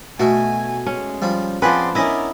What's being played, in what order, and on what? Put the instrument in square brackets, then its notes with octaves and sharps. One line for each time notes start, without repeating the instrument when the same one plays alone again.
[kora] B2 [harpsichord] A3 F#4 [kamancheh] G#5
[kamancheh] G#3 [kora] C#4
[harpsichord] F3 G3
[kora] F3 B4 [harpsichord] B3 C4 G#4 [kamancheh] C5 D5
[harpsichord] B3 C#4 [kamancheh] D4 A#4 [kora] E4 D#5